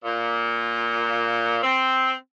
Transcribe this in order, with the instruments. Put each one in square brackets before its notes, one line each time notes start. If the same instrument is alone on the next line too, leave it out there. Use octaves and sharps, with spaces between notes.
[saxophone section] A#2
C4